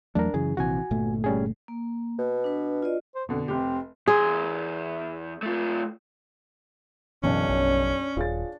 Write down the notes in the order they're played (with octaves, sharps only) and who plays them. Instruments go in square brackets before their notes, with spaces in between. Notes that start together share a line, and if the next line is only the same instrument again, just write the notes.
[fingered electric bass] E2 F#3 A3 [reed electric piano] D4 A#4
[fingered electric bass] F#2 C#3 E3 [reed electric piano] G#4
[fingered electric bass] A#1 C3 E3 [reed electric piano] F#4 G#5
[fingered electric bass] G1 A#2 A3
[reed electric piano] G3 C#4 G#4
[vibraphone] A#3
[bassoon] B2
[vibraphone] D4 B4
F4 D5 D#5
[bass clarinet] C5
[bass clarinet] F2 [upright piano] B2 D3
[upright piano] F1 G4 [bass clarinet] C4
[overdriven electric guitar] E2 C6 [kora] G#4
[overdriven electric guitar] A3 F4
[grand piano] F#1 B1 [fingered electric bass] B2 E3 [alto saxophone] C#4 [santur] D4 C#5
[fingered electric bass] A#1
[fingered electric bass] D#1 [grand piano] F4 G#4 A6